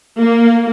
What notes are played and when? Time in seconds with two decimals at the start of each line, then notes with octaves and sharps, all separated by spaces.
0.20 A#3